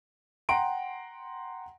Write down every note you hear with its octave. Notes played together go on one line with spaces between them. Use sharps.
F#5 G5 A#5 C6 D7